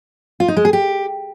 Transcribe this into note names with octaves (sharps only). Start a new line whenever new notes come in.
F4
D#4
G#3
G#4
G4